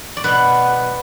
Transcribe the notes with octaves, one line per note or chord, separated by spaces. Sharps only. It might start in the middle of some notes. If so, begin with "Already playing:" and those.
D5
B2 B3 B4